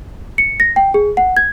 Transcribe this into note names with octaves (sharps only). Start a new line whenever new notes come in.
C#7
A#6
G5
G#4
F#5
G#6